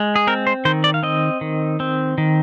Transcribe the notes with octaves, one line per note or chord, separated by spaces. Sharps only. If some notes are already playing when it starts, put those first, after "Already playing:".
Already playing: G#3
G#4
C4 A#4
C5
D#3 C5
D5
F5
C4 D#5
D#3
C4
D#3